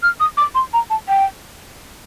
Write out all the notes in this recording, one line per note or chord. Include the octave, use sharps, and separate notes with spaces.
F6
D#6
D6
C6
A#5
A5
G5